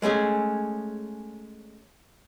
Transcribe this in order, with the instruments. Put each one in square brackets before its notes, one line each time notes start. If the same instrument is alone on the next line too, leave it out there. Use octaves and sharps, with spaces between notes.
[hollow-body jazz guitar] G#3 A3 C#4 G#4